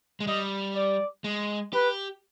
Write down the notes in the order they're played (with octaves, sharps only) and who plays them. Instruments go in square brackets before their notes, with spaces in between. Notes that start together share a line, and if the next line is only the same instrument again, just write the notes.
[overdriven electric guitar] G#3
[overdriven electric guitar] G3 [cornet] D#5
[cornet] D5
[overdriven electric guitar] G#3
[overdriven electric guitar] G4 [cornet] B4